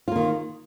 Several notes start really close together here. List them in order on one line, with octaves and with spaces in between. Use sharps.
F4 A#3 D#3